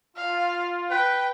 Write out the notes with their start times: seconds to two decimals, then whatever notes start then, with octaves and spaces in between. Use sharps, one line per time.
0.16 F4 F5
0.91 B4 G5